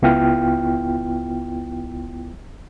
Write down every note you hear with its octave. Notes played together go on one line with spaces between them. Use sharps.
C#2 B3 E4 F4 G5 F6